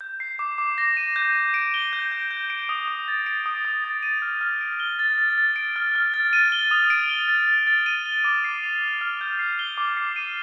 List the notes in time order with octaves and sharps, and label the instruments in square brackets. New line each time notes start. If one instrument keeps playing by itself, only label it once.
[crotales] G6
C7
D6
D6
A#6
D#7
G6
G6
D7
G7
G6
G6
G6
D7
D#6
D#6
A6
D7
D#6
D#6
A6
D#7
F6
F6
D7
G7
A6
A6
A6
D7
F6
F6
A6
D#7
G7
D#6
D7
G7
A6
A6
A6
D#7
G7
D6
C7
F7
F6
F6
G6
C7
G7
D6
C7
D#7